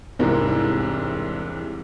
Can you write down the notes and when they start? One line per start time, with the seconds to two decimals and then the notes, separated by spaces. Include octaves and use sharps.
0.19 E1 C2 G#2 C3 E3 A#4